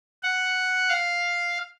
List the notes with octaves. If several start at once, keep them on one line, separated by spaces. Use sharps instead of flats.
F#5
F5